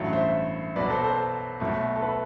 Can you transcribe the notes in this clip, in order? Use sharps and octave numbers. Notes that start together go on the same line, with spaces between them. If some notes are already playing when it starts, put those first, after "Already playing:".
Already playing: A1 G2 F#3 A3
C5 E5
B1 B2 F#3 B4 D5
A4 C5
A4 C5
B1 B2 A3
A4
B4